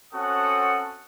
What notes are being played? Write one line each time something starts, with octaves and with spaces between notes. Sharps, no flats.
C4 C#4 F#4 A4 F#5 D#6